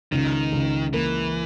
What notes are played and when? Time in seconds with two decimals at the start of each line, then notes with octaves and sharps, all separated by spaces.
0.12 C#2 D#3
0.52 C#2
0.93 E3 A#3